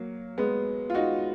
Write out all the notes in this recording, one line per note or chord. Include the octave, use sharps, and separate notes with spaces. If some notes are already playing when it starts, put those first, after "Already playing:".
Already playing: F#3 A#3
G#3 B3
F4
D#4 F#4